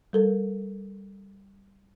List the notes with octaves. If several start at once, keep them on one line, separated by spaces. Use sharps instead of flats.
G3 A4 A#4